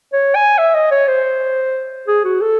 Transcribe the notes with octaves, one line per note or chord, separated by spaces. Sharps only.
C#5
G#5
E5
D#5
C#5
C5
G#4
F#4
A4